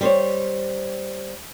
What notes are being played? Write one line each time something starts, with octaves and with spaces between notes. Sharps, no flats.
G3 C5 C#5